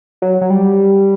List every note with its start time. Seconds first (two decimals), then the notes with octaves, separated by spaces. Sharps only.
0.22 F#3
0.41 F#3
0.50 G3